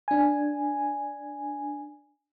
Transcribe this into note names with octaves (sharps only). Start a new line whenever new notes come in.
D4 G#5